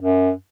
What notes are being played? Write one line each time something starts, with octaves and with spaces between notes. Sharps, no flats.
F#2